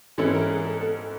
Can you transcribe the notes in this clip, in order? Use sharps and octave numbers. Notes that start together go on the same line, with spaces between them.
G#2 E3 G#3 C#4 E4 A4
A#4
G#4
A4
A4